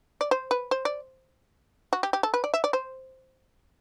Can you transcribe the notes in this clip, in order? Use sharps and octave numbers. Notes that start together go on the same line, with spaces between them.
D5
C5
B4
C5
D5
F#4
G4
G4
A4
B4
D5
E5
D5
C5